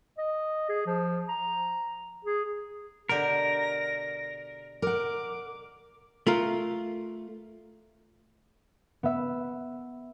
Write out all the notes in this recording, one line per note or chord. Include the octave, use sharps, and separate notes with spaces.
D#5
G#4
F3
A#5
G#4
B2 D3 G4 A#4 A#6
A#4 F#5 D6
A3 F4 A#4
B3 E5